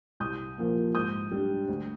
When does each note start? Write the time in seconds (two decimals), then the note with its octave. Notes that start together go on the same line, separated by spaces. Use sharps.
0.20 C2 D#6 G6
0.58 A#2 F3 A#3
0.95 G#2 D#6 G6
1.32 G3 D4
1.68 D2